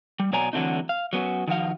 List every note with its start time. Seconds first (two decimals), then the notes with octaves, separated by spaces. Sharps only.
0.20 G3
0.33 B2 F#3 C#5 D5 G#5 A#5
0.53 D3 E3 F#3 A3 C4 D#4
0.89 F5
1.13 F#3 B3 C#4 F#4
1.48 D#3 F3 F#4 F5